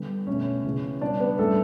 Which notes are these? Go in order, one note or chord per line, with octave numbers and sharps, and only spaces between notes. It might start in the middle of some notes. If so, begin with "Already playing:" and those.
Already playing: D3 G3 B3
B2 A3 C#4 C#5
C#3 E3 B3
E3 G3 B3 D4 D5
B3 B4
A2 G3 A3 C#4 A4